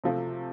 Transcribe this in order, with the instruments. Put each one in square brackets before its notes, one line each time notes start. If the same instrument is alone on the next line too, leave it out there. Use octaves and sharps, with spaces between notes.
[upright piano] C3 F3 A3